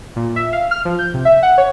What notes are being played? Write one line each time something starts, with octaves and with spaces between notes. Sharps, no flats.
A#2
E5
F5
F6
F3
G6
C3
E5
F#5
C#5